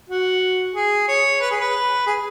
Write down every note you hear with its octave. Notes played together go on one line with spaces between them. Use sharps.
F#4
G#4
C#5
B4
G#4
B4
G#4